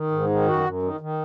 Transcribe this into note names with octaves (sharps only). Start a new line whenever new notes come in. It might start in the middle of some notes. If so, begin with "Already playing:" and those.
Already playing: D#3
G#2
D#3
F#2 F#4
F#2
D#3
D#3